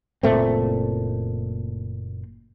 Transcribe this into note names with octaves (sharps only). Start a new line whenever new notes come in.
F#1 A#2 A3 C4